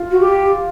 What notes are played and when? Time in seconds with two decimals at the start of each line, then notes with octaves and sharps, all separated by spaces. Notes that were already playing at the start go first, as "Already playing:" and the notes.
Already playing: F4
0.11 F#4
0.20 G4